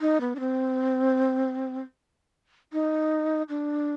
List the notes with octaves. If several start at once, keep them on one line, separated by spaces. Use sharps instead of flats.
D#4
B3
D4
C4
D#4
D4